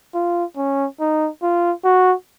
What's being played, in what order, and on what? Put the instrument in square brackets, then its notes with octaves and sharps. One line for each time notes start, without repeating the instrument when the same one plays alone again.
[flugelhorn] F4
C#4
D#4
F4
F#4